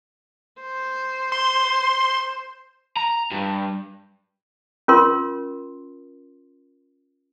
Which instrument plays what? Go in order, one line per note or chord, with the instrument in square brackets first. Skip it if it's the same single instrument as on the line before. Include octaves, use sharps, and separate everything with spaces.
[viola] C5
[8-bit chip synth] C6
[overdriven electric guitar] A#5
G2
[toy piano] C#4 F4 A#4 C6